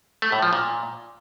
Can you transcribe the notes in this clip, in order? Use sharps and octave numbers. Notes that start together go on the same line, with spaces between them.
A3
A2
F3
A#2